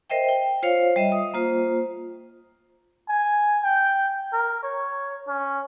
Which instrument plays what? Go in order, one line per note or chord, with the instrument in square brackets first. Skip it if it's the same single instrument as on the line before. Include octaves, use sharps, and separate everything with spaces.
[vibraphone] A#4 C5 D#5 E5 G5
G5
F4 C5 C#5 F5
G3 D#5 E5
D#6
A#3 F4 C5
[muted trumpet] G#5
G5
A#4
C#5
C#4